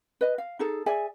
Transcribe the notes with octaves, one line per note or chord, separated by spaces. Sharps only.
B4 D#5
F5
D#4 G#4 A4
G#4 D5 E5 G#5